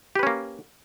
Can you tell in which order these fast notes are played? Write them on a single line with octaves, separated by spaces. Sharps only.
G4 B4 C#4 A#3